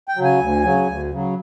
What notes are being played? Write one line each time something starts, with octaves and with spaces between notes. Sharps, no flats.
G5
C#3 F#3
G#5
D2
C#3 F#3
D2
C#3 F#3